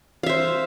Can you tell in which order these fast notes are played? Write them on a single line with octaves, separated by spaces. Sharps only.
F5 E5 C5